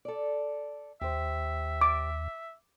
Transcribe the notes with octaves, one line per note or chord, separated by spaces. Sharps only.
A4 D5
D#2 G4 C5 E5
D6